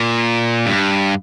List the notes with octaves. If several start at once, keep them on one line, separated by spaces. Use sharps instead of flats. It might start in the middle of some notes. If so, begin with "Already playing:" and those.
Already playing: A#2
G2